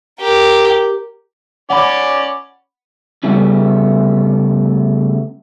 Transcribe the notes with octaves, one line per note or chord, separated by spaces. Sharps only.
G4 A#4
C#4 D5 F#5 B5
D2 C#3 G3 A3 B3